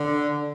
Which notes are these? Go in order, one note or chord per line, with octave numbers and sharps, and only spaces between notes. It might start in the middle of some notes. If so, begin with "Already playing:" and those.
Already playing: D3